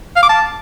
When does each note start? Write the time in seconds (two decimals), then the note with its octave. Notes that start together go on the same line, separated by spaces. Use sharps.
0.16 F5
0.23 D6
0.29 A5